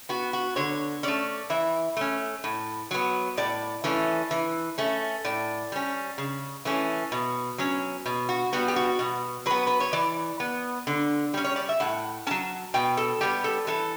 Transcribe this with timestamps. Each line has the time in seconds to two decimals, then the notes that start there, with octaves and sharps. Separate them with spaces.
0.09 B3 F#4
0.33 F#4
0.56 D3 C#5
1.03 A3 C#4 D5
1.50 E3 E5
1.97 A3 C#4
2.44 A2
2.91 F#3 B3
3.37 A2 D5
3.84 E3 A3 C#4
4.31 E3
4.78 A3 C#4
5.25 A2 D5
5.72 G3 C#4
6.18 C#3
6.65 E3 A3 C#4
7.12 B2
7.58 F#3 C#4
8.06 B2
8.29 F#4
8.53 G3 B3 F#4
8.68 G4
8.76 F#4
8.99 B2
9.46 F#3 B3 B4
9.67 B4
9.80 C#5
9.93 E3 D5
10.40 B3
10.87 D3
11.34 G3 C#4
11.44 C#5
11.56 D5
11.69 E5
11.80 A2 F#5
12.27 F#3 C#4 A5
12.74 B2 G5
12.97 A4
13.21 G3 B3 G4
13.44 A4
13.67 E3 A4